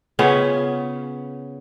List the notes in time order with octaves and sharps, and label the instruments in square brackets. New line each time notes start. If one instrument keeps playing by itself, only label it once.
[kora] C#3 B3 C#4 F4